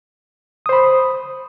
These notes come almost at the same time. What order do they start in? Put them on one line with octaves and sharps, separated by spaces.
D#6 C5 B5